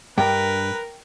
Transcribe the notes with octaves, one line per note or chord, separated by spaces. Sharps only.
G2 A#4 B4 G5